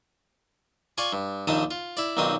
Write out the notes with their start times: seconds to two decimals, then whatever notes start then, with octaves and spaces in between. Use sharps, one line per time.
0.98 F4 D5 G#5 C#6
1.13 G2
1.47 A#1 D#2 D#3 D#4 A5 D#6
1.71 F4
1.97 E4 D5
2.17 B1 A#2 D#3 C4 F#4 D#6